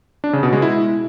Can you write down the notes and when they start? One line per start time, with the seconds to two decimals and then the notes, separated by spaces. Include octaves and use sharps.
0.24 D4
0.33 C#3
0.43 B2
0.53 G#3
0.62 E4